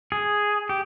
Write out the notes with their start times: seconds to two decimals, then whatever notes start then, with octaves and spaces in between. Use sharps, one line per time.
0.12 G#4
0.69 G4